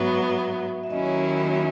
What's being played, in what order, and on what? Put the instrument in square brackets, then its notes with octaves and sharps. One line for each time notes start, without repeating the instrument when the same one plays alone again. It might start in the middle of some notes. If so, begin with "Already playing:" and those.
Already playing: [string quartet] G#2 F#3 B3 [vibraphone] E5
[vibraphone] E5
[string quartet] D#2 D#3 F#3 C#4 E4 [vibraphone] D#5
[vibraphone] C#5